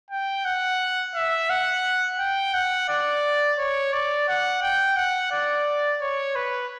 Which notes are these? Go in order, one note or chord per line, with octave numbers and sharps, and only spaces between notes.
G5
F#5
E5
F#5
G5
F#5
D5
C#5
D5
F#5
G5
F#5
D5
C#5
B4